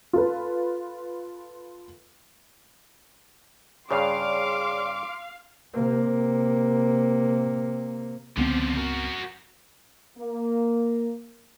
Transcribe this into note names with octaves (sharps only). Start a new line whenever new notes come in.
F4 A4 B4
G2 C#3 G#4 C#5 D5 F5 C6 D6
C3 A#3
C#2 D3 F3 B3 C4
F#4 A#4
A#3